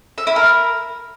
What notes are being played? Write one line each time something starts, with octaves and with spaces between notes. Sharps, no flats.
E5
E4
A#4